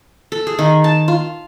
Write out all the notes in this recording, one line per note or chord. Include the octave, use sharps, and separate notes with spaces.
A4
G#4
D#3
A5
F4